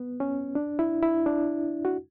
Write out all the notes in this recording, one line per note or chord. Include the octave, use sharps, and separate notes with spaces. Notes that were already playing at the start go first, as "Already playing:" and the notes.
Already playing: B3
C#4
D4
E4
E4
D4
F#4